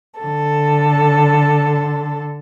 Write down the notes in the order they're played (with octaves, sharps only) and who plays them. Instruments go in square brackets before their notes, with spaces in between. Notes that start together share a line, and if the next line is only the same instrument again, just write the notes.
[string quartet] D3 A4